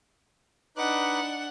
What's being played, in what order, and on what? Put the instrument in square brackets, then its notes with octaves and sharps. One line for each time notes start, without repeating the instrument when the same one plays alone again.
[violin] D4 F#5 [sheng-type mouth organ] D#4 B4 D6